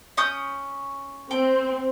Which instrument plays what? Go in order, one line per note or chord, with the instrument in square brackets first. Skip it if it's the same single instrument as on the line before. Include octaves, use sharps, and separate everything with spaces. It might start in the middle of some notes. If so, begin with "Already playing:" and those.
[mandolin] C#4 D#6 G6
[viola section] C4 [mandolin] G5